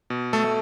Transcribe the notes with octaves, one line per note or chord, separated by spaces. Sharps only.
B2
A3 A4
A3